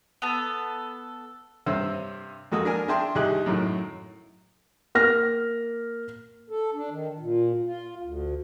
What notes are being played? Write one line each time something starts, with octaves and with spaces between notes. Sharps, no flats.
B3 A4
G2 C3 C5 C#5 E6
F2 G#3 A#3 F#4 A4 D#6
D4 A#4 G#5
D4 G#4 E5 G5 A5 C6
C2 D#4 G4 G#4 F#6
F#2 A2 D#3 F#3
A#3 F6 A#6
A4
D4
D#3
A#2
F4
D2